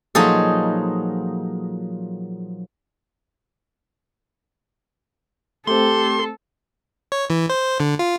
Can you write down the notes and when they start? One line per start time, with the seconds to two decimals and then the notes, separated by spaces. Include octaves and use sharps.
0.15 A#2 F3 F#3 D#4 G#4 A4
5.67 A3 C4 G4 A4 C6
7.12 C#5
7.30 E3
7.50 C5
7.80 D3
7.99 F4